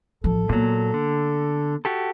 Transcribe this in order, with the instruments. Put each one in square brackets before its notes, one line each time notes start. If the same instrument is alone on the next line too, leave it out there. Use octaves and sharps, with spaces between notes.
[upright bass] A1 F3 [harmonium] A4
[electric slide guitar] A#2 F#3 [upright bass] A#3 B3
[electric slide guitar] D3
F#4 G4 A4